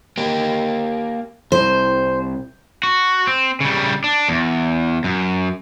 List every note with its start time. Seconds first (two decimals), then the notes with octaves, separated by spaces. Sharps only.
0.17 A#3 G4
1.52 C2 C5
2.83 F#4
3.27 C4
3.60 C#3 G3
4.04 D4
4.29 E2
5.04 F#2